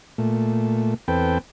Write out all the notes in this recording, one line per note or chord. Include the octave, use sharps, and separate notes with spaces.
A#2 A3
E2 C4 A4 B4 G5